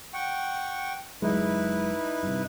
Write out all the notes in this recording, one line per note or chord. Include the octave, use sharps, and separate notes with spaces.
F#5 G5 C#6
F#1 F#3 G#3 D#4 E4 B4
G2 C3